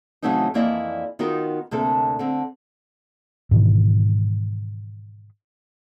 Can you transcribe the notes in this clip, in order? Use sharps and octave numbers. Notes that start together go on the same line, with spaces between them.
C#3 E3 F#3 A3 C4 D#4
F2 E3 A#3 E4 D5 D#5
D#3 B3 D#4 F4 F#4 A#4
D2 C3 A#3 D4 A4
D3 C4
G#2 B2 D#3 E3